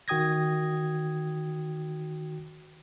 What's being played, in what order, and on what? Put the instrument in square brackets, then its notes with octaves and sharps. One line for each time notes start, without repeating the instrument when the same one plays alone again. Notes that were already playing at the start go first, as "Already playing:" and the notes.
[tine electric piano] D#3 F#4 G5 D#6 G#6 A#6